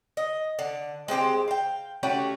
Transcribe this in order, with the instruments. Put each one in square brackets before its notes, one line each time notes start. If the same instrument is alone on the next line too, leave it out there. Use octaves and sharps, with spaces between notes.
[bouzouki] D#5
D3
G#3 C4 G4 C5
F5 G5
A3 C#4 F#4 G4